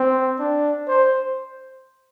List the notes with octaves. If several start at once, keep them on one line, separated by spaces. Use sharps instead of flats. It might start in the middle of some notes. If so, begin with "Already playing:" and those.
Already playing: C4
D4
C5